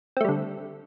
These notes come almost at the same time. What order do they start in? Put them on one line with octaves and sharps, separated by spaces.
C4 A3 G3 D3